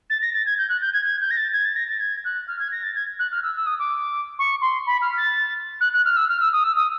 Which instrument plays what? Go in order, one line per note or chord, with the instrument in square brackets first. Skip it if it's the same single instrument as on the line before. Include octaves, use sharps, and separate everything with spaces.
[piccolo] A6
A#6
A6
G#6
G6
F#6
G6
G#6
G#6
G6
A#6
A6
G#6
A6
A#6
A6
G#6
F#6
F6
G#6
A#6
A6
G#6
F#6
F6
E6
E6
D#6
D6
C#6
C6
B5
F6
A6
F#6
F#6
F6
E6
F6
E6
D#6
E6
D#6